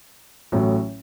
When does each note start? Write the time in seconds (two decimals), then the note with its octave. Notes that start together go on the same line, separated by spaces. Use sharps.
0.52 A1 A2 F#3